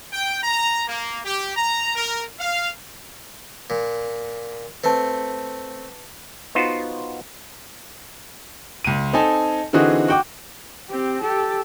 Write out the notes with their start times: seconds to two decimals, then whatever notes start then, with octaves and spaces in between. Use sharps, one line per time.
0.13 G5
0.43 A#5
0.88 A#3
1.25 G4
1.56 A#5
1.95 A#4
2.39 F5
3.70 A#2
4.84 A3 C4 B4 A5
6.55 B3 D#4 F4 F#4 C5
8.84 C#2 D#7
9.13 C4 D#4 A4 G#5 A5
9.73 D3 E3 C4 D#4 F#4 G#4
10.08 F#4 G5 D6
10.90 C4 G4
11.22 G4 A4